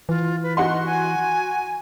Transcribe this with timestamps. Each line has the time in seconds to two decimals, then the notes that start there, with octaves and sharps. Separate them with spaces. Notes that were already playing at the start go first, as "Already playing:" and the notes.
0.09 E3 F4
0.43 B4
0.57 D#4 F#4 F#5 C6
0.85 G#5